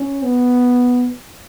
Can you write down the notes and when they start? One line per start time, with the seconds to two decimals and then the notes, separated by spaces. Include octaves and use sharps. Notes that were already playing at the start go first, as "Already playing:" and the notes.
Already playing: C#4
0.24 B3